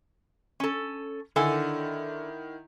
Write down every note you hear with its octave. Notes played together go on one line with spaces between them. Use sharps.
C#4 A4
D3 D#3 E4 A4 F#5 G#5